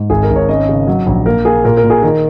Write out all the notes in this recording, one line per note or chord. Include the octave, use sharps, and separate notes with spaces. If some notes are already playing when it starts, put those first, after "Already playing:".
Already playing: G#2
G#1 G#4
A#4
G#1
C#5
C#4 D#5
C#3
F#3
A#1
A#3 A#4
A#3 G#4
A#2 A#4
A#4
A#2
G#4
D#3 A#4